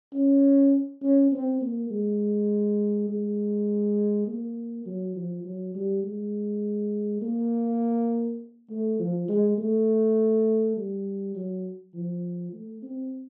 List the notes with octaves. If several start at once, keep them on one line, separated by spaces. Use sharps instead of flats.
C#4
C#4
C4
A#3
G#3
G#3
A#3
F#3
F3
F#3
G3
G#3
A#3
A3
F3
G#3
A3
G3
F#3
F3
A3
C4